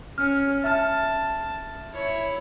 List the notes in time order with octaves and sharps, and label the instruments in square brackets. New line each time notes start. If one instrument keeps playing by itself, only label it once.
[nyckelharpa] C#4 [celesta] F6
[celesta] E5 F6 [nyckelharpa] A5
[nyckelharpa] E4 C#5